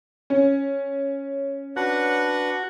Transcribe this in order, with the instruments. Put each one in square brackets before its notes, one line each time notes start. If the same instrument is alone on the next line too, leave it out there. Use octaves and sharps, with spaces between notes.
[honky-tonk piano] C#4
[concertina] D4 B4 F#5 [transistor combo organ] F#4